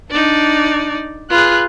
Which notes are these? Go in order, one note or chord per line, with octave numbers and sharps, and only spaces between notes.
D4 D#4 D5
F4 G#4 B4 F#6